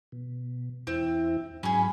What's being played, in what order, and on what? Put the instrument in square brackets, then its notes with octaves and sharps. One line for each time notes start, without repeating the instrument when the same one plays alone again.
[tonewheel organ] B2
[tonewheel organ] E2 E4 [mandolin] C4
[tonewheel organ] G#2 F#3 B5 [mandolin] C#4 G#4